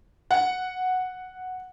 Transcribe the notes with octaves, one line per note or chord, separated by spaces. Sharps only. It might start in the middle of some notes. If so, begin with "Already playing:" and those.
F#5